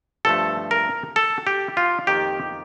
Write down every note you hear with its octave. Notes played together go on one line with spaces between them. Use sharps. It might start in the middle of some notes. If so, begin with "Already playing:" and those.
G2 F3 A3 A4
A#4
A4
G4
F4
F2 D#3 A#3 G4